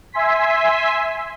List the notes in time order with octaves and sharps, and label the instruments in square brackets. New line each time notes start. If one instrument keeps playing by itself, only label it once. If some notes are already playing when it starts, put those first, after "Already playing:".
[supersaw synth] E5 G#5 C6 B6